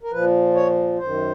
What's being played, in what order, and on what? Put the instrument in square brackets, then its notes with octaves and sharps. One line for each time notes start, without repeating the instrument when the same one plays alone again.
[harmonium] A#4
A#2 F3 B4
C#5
F#2 D#3 C5